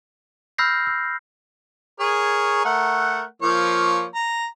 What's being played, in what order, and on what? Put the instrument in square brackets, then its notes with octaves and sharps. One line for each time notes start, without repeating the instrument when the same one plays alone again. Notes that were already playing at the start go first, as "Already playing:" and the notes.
[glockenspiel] B5 E6 F6 G6 A#6 C7
E6
[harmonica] G#4 A#4 C#5
A3 A#4 F#5
F3 A#3 C#5
A#5